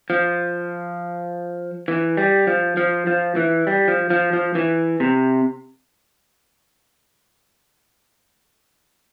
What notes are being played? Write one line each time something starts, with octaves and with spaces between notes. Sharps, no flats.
F3
E3
G3
F3
F3
F3
E3
G3
F3
F3
F3
E3
C3